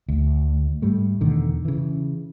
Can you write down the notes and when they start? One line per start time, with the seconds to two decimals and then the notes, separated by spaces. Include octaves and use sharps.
0.09 D2
0.82 G#2 G3 A3
1.21 E2 B2 D3 D#3
1.65 C#3 E3